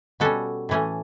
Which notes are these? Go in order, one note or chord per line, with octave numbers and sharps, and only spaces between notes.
B2 G3 C#4 F#4 A4
A2 E3 A3 C#4